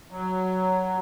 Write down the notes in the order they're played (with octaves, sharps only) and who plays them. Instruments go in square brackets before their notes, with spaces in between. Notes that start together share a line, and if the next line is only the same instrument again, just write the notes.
[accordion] F#3